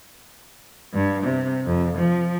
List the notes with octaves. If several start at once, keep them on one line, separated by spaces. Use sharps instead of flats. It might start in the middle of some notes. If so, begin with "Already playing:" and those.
G2
C3
F2
F3